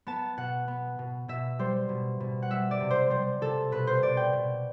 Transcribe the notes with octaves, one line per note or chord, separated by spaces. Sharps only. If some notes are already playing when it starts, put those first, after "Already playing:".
B3 A5
B2 F#5
B3
B2
B2 E5
G3 C5
B2
B2
F#5
G3 E5
D5
C3
C5
G3 C5
C3 A4
B2 B4
C5
B2 D5
G5
B2